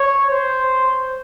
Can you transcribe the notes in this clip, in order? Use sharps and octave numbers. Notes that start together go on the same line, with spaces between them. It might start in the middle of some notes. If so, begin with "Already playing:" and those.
Already playing: C#5
C5